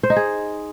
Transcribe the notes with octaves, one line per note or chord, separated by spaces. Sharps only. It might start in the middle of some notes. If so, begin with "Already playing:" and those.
C5
D#4
G#4